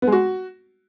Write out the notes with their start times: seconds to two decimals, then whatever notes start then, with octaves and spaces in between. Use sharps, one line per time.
0.02 B3
0.07 G#3
0.12 F#4